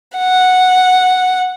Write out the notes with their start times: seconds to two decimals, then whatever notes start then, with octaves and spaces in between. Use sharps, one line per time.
0.17 F#5